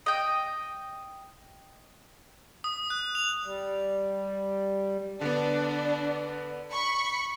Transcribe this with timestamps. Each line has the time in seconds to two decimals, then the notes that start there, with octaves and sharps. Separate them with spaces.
0.06 D#5 G5
2.64 D#6
2.90 F#6
3.15 F7
3.45 G3
5.21 D3 B3 D4
6.71 B5 C#6 C#7